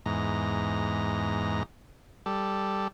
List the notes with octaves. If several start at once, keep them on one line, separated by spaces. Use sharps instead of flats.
E2 G#2 A#5
G3 A4